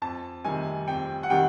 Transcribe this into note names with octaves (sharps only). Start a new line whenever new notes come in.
F2 A5
C3 D#3 G3 G#5
F2 G5
F#5
C3 D#3 G3 G5